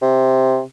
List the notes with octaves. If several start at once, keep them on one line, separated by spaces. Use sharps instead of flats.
C3